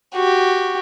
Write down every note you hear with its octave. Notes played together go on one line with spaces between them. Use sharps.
F#4 G4